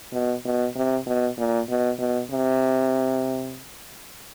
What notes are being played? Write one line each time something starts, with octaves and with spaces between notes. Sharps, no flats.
B2
B2
C3
B2
A#2
B2
B2
C3